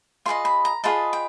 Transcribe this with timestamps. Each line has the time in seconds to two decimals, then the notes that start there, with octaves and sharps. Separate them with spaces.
0.26 F4 G#4 B4 D#5 C6
0.45 B5
0.65 A#5
0.84 F4 G#4 B4 D#5 A5
1.13 G5